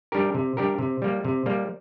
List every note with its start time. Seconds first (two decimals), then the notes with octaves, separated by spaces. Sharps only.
0.12 G3 D4 G4 A#4
0.35 C3
0.57 G3 D4 G4 A#4
0.79 C3
1.02 G3 A#3
1.25 C3
1.46 G3 A#3